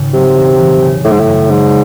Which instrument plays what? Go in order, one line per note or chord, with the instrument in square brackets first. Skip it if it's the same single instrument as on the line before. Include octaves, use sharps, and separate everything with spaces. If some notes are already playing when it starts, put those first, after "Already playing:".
Already playing: [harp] G#1 C#3
[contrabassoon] C3 [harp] F#3
[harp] E1
E3
C#3
[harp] F#1 [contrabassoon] A2
[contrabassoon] G#2
A2
[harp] F#2
[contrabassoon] G#2 [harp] F#3